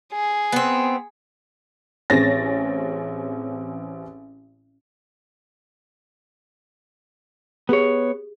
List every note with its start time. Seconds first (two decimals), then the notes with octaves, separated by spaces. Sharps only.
0.13 G#4
0.52 B3 C4
2.10 A1 C4 G#4 C#5 A6 A#6
7.69 B3 G4 G#4 C#5